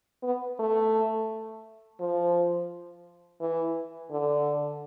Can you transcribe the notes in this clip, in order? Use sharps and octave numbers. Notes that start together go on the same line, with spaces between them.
B3
A3
F3
E3
D3